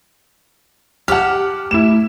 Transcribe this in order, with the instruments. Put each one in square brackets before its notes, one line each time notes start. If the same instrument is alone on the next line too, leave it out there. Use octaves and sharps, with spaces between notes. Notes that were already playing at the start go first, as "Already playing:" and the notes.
[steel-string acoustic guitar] G4 A5 [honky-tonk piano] F#5 F6
[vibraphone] A3 [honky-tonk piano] E4 E7